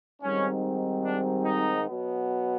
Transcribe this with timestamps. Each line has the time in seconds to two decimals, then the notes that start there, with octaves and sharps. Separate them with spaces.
0.22 G#2 D#3 G3 C4 C#4
1.05 D4
1.45 D#4
1.87 B2 F#3 B3